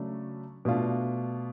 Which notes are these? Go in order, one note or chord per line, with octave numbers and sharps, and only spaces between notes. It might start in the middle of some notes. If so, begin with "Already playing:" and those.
Already playing: C#3 F#3 A3 D4
B2 A3 D4 F4